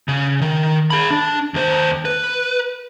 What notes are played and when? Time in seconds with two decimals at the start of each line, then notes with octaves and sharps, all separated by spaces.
0.08 C#3
0.41 D#3
0.90 G#4 B5
1.11 D4
1.54 D#2 C5
2.05 B4